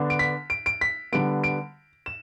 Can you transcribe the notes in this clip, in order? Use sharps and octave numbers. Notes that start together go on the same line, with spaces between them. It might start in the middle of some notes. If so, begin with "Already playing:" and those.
Already playing: D3 B3 D4
D7
B6
D7
D7
B6
D3 G3 B3 D7
D7
E7